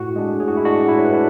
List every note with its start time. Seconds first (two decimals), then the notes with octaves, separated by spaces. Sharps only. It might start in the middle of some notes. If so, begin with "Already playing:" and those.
Already playing: A2 F#4
0.16 G#3 D4
0.40 A2 G#4
0.48 F#4
0.57 E4
0.65 G#3 D4 F#4
0.88 A2 E4
0.98 C#5
1.05 B4
1.13 D4 E5